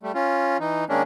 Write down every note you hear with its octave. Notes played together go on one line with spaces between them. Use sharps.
G3 A3
C#4 F4
E3 D#4
D#3 G#3 A#3 C#4 D4